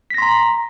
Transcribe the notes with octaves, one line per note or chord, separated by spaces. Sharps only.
A#5 C6 A#6 B6